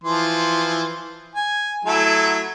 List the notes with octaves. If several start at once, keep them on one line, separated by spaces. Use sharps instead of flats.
E3 F3 C6
G#5
F#3 A3 E4